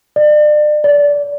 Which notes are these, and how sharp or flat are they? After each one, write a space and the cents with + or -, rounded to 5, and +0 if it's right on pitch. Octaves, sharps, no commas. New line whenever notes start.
D5 +35
D5 -20